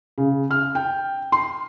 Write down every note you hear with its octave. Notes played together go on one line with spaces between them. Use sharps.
C#3
F6
G5
C6